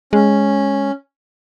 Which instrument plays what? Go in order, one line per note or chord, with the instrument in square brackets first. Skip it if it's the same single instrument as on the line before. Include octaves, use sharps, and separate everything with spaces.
[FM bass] G#3 [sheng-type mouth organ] C#4